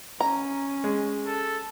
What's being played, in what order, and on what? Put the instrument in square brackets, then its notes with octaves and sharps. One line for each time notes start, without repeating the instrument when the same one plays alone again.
[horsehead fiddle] C#4 [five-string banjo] A#5
[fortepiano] G#3
[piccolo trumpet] A4